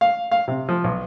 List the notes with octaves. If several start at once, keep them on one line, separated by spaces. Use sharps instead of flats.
F5
F5
C3
F3
B1